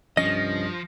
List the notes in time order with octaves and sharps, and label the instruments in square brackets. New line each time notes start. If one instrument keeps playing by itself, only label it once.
[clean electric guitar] C2 C#4 D#5 [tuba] G2 [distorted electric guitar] F3 [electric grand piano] A#6